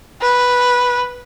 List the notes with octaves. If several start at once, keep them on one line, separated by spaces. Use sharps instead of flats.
B4